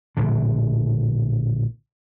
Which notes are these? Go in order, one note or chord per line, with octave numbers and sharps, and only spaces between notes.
A#1 A2 D3